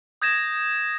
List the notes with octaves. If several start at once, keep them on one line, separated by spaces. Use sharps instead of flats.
D#6 G6 G#6 A#6 E7